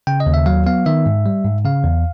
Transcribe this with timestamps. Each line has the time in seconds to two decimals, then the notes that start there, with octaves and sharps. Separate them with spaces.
0.07 C#3 G5
0.20 D#5
0.26 D#2
0.34 E5
0.46 F#3 F5
0.66 B3 F5
0.86 D#3 E5
1.06 G#2
1.26 G3
1.44 G#2
1.65 C#3 F5
1.84 E2